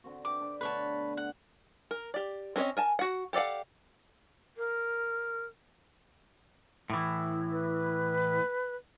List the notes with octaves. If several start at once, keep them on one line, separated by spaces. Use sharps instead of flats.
D3 C4 F#4
B4 E5 G5 D6
D4
B2 D3 A3 B4 C#5 A5
F#5
A#4
G4 D5
C4 C#4 A#4 C#5 D#5
A#4 G#5 A5
F#4 F#5
G4 A4 D5 F5 F#5
A#4
A2 E3
B4